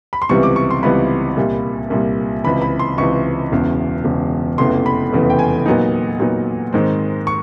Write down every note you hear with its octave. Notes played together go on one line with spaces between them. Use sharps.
B5
C6
C#2 C3 E3 G3 B3 C#6
D6
C#6
C6
C#2 C3 E3 G3 B3 B5
C2 A#2 G3
C2 A#2 G3
C#2 C3 E3 B5
B5
C6
C#2 C3 E3 C#6
E1 E2 C#3
E1 E2 C#3
F1 E2 C#3 E3 C6
B5
F1 E2 C#3 E3
G5
G#5
A#2 F#3 B3 D#4
A#2 F#3 B3 D#4
G#2 D#3 G#3 C4
C#6